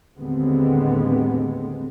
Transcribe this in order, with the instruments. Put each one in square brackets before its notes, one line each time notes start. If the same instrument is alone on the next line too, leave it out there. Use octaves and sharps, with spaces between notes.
[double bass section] D#2 A2 D3 G#3 B3 C4